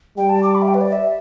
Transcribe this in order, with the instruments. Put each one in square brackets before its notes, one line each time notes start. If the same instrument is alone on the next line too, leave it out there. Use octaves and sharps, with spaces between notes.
[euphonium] G3 [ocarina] G5
[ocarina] A5
D6
B5
E5
G5
B4
D5
E5